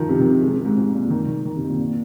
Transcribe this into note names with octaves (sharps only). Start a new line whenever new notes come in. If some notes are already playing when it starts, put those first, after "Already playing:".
Already playing: D#3 F3
C3
D#3
G#3
C3
G#2
G#2
A#2
D#3
D#3
D#3
C3
A#2
A#2